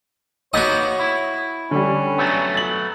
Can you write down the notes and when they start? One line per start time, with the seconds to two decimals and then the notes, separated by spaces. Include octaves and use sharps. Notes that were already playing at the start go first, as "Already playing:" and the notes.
0.54 A#3 B3 D#4 F#4 C#5 D#5 D#6
0.99 E4
1.71 D3 G3 C#4
2.17 F#3 A3 B3
2.54 A6 F#7